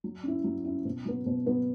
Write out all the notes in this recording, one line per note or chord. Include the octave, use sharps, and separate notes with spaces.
F#3
C#4 E4
F#3
C#4 E4
B2
F#3 B3
B2
F#3 B3